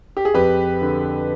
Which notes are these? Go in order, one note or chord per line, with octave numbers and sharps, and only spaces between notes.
G4
G#4
F2 G4 B4
D3